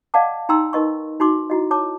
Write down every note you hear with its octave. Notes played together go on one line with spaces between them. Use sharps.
D5 D#5 F5 F#5 A5 D6
D#4 G5 A#5 C6 E6
D#4 A#4 B4 D#5 C6 C#6
D#4 F#4 C6 D6
E4 F#4 D#5
C#5 A5 D6